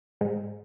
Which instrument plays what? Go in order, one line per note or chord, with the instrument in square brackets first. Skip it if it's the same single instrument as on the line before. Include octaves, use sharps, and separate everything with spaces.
[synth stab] G#2